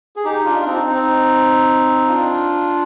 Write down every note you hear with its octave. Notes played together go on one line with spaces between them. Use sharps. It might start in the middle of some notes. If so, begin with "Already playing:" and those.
G#4
D#4 G4
D4 F4
F4
C4 D#4
C4 D#4
D4 F4